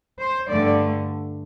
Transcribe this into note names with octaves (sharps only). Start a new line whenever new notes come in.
C5
G2 D3 A3 D5